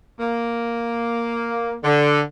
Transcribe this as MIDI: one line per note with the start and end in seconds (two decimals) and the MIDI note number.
0.19 1.74 58
1.83 2.20 50